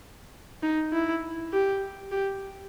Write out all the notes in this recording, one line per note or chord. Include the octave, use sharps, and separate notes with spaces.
D#4
E4
G4
G4